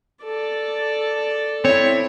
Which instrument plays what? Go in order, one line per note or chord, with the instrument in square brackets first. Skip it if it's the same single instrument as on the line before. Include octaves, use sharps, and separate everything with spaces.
[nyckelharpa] A4 D5
[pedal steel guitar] C4 E4 [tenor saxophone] C#5